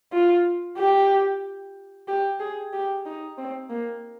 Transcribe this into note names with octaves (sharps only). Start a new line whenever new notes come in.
F4
G4
G4
G#4
G4
D#4
C4
A#3